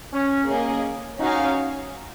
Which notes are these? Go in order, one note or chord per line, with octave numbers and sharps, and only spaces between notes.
C#4
A#3 C#4 G#4 D#5
C#4 D#4 F#4 C#5 F5 G#5